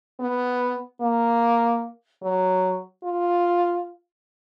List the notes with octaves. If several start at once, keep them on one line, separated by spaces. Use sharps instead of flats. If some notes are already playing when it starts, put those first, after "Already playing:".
B3
A#3
F#3
F4